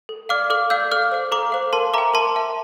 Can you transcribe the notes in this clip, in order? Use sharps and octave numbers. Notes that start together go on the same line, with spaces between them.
A4
D5 F5 D6 F6
A4 D6 F6
D5 F5 E6 G6
A4 D6 F6
C5 F5
A4 A#5 D6
C5 F5
A#4 A5 C6
E5 G5 A#5 D6
A#4 A5 C6
E5 G5